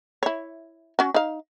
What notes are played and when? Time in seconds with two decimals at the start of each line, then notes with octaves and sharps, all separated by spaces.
0.23 E4 C#5
0.99 C#4 F#4
1.14 D#4 F5